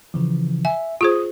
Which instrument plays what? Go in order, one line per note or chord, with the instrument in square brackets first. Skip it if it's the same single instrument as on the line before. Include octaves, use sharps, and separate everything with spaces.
[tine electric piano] C#3 E3 F3
[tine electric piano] E5 [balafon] G#5
[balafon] F4 G#4 C5 [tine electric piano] D#6